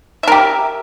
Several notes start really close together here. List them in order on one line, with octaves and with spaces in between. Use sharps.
E5 A#4 G4